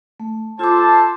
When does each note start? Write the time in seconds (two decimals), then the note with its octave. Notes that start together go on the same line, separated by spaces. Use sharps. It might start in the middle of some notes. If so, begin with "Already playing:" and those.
0.20 A3
0.59 F4 A4 C5 A5 D6